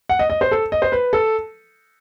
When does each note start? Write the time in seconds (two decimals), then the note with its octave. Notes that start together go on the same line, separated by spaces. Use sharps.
0.09 F#5
0.19 D#5
0.30 D#5
0.41 C5
0.51 A4
0.72 D#5
0.82 C5
0.92 B4
1.13 A4